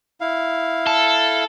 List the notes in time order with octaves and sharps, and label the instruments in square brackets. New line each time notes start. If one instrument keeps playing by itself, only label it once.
[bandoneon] E4 F5
[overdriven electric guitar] A4